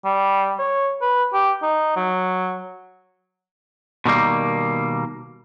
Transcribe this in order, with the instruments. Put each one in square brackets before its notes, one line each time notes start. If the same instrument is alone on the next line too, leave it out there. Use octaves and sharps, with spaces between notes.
[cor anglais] G3
C#5
B4
G4
D#4
F#3
[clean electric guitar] B2 D#3 G3 A#3